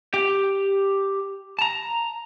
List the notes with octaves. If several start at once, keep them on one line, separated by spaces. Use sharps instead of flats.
G4 G5
A5 A#5